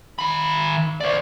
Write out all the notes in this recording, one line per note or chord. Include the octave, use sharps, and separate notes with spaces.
D#3 B5
C5 D5